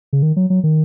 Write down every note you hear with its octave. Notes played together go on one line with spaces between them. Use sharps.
C#3
D#3
F#3
F#3
D#3